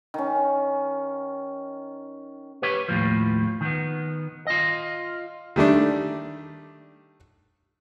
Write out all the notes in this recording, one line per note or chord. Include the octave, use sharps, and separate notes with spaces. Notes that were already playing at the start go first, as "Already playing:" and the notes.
D#3 C#4
G4 B4 C#5
D#2 A2 F3
D#3 B3
F4 D#5
D#3 G3 A3 D4